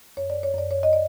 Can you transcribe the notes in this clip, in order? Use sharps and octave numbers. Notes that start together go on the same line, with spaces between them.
F#2 C#5
D5
C#5
F#2 D5
C#5
D#5
D5